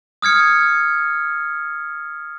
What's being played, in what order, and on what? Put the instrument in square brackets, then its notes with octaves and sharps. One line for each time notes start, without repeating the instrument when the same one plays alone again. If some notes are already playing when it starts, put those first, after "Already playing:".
[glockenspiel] D#6 F6 G#6 C#7